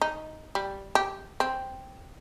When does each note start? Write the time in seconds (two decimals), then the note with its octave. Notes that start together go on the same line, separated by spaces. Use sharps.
0.01 D#4
0.55 G3
0.95 G4
1.40 C4